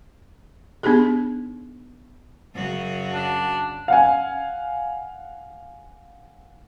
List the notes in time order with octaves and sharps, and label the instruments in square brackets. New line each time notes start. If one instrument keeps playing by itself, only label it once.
[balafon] B3 D4 D#4 G4 G#4
[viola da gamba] F#2 C#3 F#4
[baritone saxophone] D4
[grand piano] F5 F#5 G#5